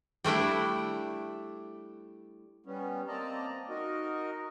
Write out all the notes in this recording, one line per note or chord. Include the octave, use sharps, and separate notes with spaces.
G3 A3 D4 E4
G3 B3 C#4
A#3 C4 D5 D#5 A5 A#5
D#4 F#4 A#4 D#5